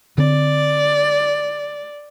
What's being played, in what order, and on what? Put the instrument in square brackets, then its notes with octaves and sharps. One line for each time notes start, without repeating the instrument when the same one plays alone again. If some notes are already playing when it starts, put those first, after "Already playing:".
[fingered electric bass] D3 C4 [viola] D5